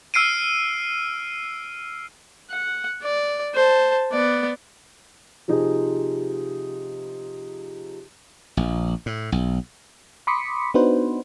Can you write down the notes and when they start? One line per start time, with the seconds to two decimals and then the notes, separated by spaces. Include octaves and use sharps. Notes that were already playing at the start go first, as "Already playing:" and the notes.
0.14 E6 F6 C7 D7 D#7
2.51 F#5
3.03 D5
3.55 C5 A5
4.12 B3 D5
5.48 C3 F3 D#4 G#4
8.57 A#1
9.06 A2
9.32 B1
10.27 B5 C6 D6 D#6 B6 C#7
10.74 B3 D4 D#4 F#4 B4 C5